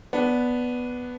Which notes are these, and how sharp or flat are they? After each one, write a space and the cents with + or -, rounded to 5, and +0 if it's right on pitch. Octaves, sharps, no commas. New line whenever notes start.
B3 +0 D4 -10